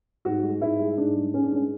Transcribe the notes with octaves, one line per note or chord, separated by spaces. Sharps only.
G#2 F#4
G#3
G#2 E4
G#3
G#2 D4
G#3
G#2 C#4
D4
G#3 C#4